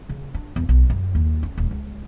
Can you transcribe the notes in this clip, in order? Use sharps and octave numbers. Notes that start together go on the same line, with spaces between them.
C#3
D4
E2
B1
F#2
D#2
C#4
D#1
C#2